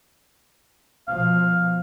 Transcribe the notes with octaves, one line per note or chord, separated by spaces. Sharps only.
B2 F3 F5